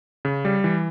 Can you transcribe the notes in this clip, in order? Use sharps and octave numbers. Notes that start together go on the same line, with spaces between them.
C#3
G3
E3